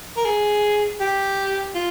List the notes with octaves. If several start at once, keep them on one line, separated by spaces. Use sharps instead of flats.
A#4
G#4
G4
F4